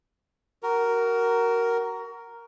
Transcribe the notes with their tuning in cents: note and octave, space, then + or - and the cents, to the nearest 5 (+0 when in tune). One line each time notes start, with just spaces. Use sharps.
F#4 +25 A#4 +0